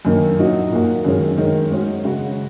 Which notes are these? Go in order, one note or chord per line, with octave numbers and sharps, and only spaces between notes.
F#2 D#3 A#3
A#2 F#3 D#4 F#4
A#2 A#3 F#4
F#2 D#3 G#3 C#4
D#3 G#3 C#4
G#2 G#3 C#4 F#4
C#3 G#3 F#4